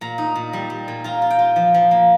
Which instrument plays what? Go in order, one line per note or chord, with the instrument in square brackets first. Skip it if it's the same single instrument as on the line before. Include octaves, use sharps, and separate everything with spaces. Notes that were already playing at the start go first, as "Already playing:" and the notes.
[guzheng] A#2 A#5
D#4
A#2
G3
G3
A#2
F4 A#5
F4
G5
F4
F3
F3
A#3